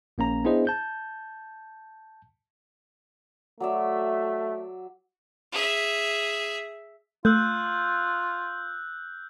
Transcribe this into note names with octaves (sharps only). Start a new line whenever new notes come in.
A#1 A#3 C#4 A#5
B3 D4 E4 G#4 C5 D#5
A5 G6
F#3 A3 D5 E5
G#4 E5
A3 F4 E6 F#6 G6